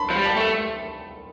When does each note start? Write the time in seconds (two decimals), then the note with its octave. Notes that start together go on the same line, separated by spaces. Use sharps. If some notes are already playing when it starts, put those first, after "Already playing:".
Already playing: A5 B5 C6
0.10 F3
0.16 G3
0.25 A5
0.36 A3